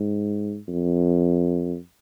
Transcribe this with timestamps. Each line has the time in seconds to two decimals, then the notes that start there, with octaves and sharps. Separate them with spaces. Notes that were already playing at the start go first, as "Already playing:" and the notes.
Already playing: G#2
0.68 F2